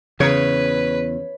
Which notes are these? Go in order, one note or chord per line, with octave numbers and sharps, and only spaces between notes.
E2 C#3 B4 C#5